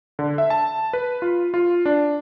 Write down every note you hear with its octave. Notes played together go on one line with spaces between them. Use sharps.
D3
E5
A5
B4
F4
F4
D4